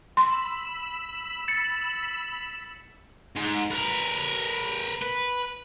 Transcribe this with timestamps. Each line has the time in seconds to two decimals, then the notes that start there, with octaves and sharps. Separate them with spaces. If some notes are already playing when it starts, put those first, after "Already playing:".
0.17 B5 C6 E6
1.48 A6 C#7
3.36 G#2
3.71 A#4 B4
5.02 B4